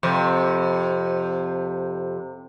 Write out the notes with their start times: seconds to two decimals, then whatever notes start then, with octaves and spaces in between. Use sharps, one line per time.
0.03 F2 C3